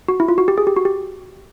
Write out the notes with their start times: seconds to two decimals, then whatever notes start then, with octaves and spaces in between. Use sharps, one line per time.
0.08 F#4
0.20 E4
0.28 F4
0.38 F#4
0.48 G4
0.58 G#4
0.67 G4
0.76 F#4
0.85 G4